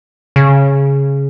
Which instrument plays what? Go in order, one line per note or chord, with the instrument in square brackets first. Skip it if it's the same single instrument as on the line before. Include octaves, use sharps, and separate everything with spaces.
[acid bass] C#3